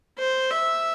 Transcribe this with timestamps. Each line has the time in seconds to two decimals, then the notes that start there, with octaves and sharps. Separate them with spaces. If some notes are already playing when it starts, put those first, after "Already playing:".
0.18 C5
0.51 E5